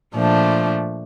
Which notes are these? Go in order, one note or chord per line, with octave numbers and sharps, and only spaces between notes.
A#2 F3 A3 D4